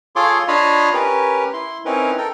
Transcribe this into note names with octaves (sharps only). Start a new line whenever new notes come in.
F4 G#4 A4 C#5 C6 D6
D4 F4 C#5 D#5 F5 B5
C#4 G4 A#4 B4
E4 C6
C4 C#4 D#4 E4 A#4 B4
A4 A#4 G5